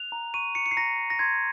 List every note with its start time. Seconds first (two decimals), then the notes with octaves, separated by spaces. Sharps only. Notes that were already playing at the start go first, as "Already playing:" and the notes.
Already playing: F#6 F7
0.12 A#5
0.34 C#6 D#7
0.55 C#6 C#7
0.66 C#7
0.71 C7
0.77 A#5 A#6
0.98 A#5
1.10 A#6
1.19 C6 G#6